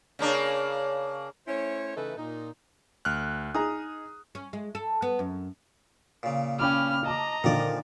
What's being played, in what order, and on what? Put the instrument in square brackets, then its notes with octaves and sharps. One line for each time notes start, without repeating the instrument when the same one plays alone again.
[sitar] C#3 A#3 D4
[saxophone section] A3 C#4 E4 C5 C#5
C#3 E3 A3 D#4 A4 B4
A#2 D#4
[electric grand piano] D2 F6 F#6
[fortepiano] D#4 G#4 A#5 [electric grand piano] D#6
[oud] C#4
G#3
A4
B3
F#2
[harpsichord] A#2 C#3
[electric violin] C#4 F6 [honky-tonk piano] G5 B5 D6
[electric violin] D#5 A#5 [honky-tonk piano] A5 D6
[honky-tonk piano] A#2 D3 [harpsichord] D#3 F3 D5